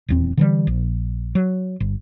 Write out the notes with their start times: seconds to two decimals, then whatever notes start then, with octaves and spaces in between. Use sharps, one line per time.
0.09 D#1 E2 C4
0.37 D3 E3 G3
0.67 A#1
1.35 F#3
1.80 G1